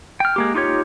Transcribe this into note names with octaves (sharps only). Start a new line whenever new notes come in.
G5 F6
G#3 A#3 G4
D#4 F4 G4 C#5